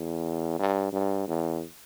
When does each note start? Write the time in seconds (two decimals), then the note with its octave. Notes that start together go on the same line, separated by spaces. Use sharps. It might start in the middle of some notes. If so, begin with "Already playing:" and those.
Already playing: E2
0.59 G2
0.92 G2
1.28 E2